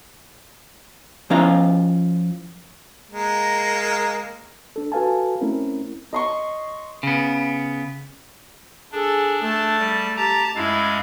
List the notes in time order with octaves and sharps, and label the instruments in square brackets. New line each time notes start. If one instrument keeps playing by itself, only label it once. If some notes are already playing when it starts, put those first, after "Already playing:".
[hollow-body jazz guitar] F3 C#4 E4 F4 F5 A#5
[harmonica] G#3 A#3 A#4
[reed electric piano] D4 A4
F#4 A4 B4 F5 G#5 A5
A3 C4 C#4 E4 A#4
[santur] D#5 C6 C#6
[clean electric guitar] C#3 B3
[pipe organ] D4 [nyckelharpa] G#4 A4
[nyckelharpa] A3 A5
[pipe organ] G3
[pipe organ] G4 A#5 [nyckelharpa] A5
[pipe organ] F#2 G#3 F5 [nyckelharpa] E4